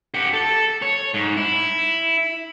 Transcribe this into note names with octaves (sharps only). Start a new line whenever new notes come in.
G4 F#5
A4
C#5
G#2
E4